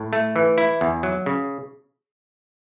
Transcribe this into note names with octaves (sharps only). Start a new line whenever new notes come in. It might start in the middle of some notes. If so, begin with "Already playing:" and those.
Already playing: A2
A3
E3
E4
E2
F#3
C#3